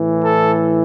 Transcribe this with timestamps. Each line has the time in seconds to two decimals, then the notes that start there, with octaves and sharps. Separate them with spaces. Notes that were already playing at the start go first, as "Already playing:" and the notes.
Already playing: A2 E3
0.23 A4